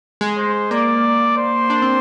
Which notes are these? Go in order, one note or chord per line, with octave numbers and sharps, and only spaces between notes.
G#3
C5
A#3 D5
C5
D4
C4